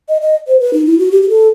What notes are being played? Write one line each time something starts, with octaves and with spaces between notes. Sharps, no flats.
D#5
D#5
C5
B4
D#4
E4
F#4
G4
G4
A4